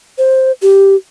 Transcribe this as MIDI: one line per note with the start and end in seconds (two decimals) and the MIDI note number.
0.18 0.52 72
0.62 0.96 67